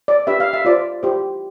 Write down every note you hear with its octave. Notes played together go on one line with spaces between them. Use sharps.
D5
D4 G4 B4 E5
F5
E5
F4 C5 D5
E4 G4 C5